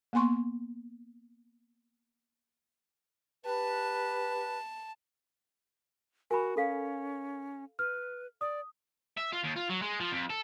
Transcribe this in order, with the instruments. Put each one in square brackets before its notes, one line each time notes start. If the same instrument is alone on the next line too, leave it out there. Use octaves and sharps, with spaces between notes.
[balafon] A#3 B3 G#5 C6 C#6
[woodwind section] G4 B4 [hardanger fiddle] A5
[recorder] F#4 [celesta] A#4 [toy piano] G#5 B5
[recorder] C#4 [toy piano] A4 F5
[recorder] B4 [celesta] F6
[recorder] D5 [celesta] D#6
[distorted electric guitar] E5
F4
D#2
F4
F#3
G#3
F3
F2
A4